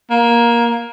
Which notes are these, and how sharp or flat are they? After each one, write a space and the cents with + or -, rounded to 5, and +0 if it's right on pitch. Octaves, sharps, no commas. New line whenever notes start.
A#3 +15